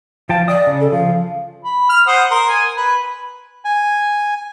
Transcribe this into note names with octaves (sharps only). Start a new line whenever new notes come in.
F3 F5 G5 A5
D5 D#5 D#6
C#3
A4
F3 F5
B5
F6
C5 F#5 D#6
A#4 C6
G#5
B4
G#5